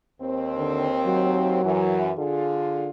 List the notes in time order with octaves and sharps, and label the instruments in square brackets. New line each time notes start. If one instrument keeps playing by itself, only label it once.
[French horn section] D#2 C4
[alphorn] D3
F#3
[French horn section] F#2 E3
D3 F4 G#4